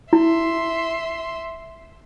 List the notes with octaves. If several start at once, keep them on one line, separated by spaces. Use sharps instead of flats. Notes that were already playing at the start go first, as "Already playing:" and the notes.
E4 E5 C6